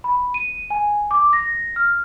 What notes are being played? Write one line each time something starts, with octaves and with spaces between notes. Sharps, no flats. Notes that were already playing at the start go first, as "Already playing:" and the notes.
B5
D#7
G#5
D6
A#6
F6